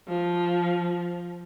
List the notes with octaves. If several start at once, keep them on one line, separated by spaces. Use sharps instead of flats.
F3